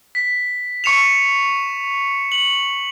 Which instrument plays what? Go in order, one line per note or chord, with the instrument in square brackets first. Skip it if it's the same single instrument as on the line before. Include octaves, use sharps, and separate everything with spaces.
[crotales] B6
C#6 C#7 E7 F7
F#7